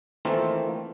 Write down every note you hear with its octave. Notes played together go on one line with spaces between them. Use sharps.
D#3 E3 A3 A#3 C4 F4